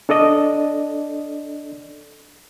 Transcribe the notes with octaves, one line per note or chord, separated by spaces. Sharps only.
D4 A4 D5 D#5